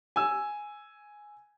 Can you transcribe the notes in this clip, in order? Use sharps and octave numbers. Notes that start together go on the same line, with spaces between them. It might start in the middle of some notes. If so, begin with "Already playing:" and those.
G#5 E6